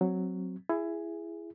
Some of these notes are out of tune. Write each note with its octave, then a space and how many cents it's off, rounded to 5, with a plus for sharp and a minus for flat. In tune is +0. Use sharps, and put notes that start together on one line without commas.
F#3 +0 C4 +0
E4 +20 G#4 +0